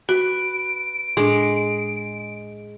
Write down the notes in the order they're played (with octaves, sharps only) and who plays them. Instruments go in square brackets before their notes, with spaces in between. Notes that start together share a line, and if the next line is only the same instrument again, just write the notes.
[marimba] F#4 [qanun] B4 [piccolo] D7
[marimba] A2 D4 [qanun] G#3